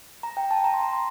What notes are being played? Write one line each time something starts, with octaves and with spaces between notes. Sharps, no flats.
A#5
G5
A5
A#5
C6
A#5
C6